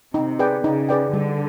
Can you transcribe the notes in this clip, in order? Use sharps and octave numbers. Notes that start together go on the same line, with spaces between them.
C3 D#4
G#4 B4 D5 G5
C#3 D#4
G#4 B4 D5 G5
D3 G3